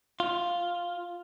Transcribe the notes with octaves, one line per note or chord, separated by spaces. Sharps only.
F4